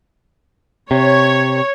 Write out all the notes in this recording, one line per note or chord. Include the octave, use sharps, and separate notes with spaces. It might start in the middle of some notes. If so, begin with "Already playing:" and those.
C3 C#5